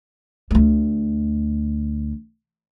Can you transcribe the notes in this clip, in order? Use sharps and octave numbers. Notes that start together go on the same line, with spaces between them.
D2 A3